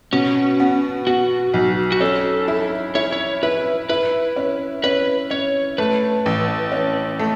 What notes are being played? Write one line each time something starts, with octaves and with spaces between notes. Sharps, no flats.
B2 C#4
B3
B3 F#4
B1
F#4
C#4 A4
E4
E4 C#5
C#5
E4 B4
E4 B4
C#4
C#4 B4
C#4 C#5
A3 B4
A1
C#4
A3